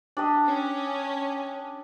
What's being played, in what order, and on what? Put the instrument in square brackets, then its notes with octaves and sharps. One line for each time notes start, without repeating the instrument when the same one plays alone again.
[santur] D4 G4 D#5
[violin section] C#4